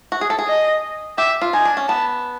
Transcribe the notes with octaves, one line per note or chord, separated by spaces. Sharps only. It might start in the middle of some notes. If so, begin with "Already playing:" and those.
F#4
G#4
A4
G#4
D#5
G4 E5
F4
D#4 G#5
D4
C#4
B3 A5